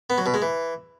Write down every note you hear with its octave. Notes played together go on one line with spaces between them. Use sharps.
B3
F#3
B2
G#3
E3